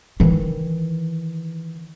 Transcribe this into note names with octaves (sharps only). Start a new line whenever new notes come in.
D#3 E3